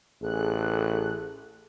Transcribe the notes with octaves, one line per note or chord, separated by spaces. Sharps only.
A1 G#4 A4 F#6